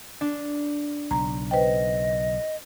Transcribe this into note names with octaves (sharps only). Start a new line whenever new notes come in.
D4
B1 C#3 A#5
B4 C5 D#5 G5